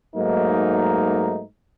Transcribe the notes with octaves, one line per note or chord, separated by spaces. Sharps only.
G#2 F#3 A3 A#3 D#4